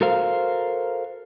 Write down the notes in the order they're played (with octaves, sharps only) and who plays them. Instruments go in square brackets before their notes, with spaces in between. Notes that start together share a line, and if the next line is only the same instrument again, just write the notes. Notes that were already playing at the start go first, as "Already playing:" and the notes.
[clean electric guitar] F#4 A4 A#4 C5 F5